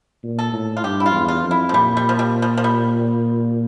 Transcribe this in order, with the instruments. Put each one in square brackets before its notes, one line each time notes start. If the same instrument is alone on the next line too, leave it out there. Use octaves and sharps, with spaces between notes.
[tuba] A#2
[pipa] A4
[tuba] A2
[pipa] F4
[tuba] G2 [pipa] G4
[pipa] E4
F4
[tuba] E2
[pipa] F4
[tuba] F2
[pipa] E4
F3
[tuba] A#2 [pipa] G3
[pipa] G3
F3
G3
F3
F3
G3